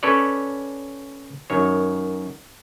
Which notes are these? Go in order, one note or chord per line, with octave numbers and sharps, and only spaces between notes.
C#4 A4 B4 C#5 D5
F#2 D#3 C#5